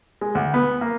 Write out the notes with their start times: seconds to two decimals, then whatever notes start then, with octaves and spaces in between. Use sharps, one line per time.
0.21 G#3
0.35 D2
0.54 B3
0.81 A#3